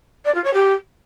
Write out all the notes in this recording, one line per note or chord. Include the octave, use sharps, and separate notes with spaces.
D5
F4
C#5
G4